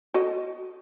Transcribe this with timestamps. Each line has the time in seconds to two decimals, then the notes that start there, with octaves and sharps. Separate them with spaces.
0.14 F#4 A4 D#5